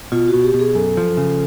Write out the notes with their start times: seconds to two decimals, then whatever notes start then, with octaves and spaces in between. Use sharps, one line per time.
0.12 B2 F4
0.28 F#4
0.34 B2
0.44 G4
0.54 B2
0.59 G#4
0.75 F#2 A4
0.97 F3
1.17 C#3